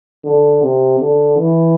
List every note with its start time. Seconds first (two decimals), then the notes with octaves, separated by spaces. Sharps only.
0.25 D3
0.63 C3
1.00 D3
1.38 E3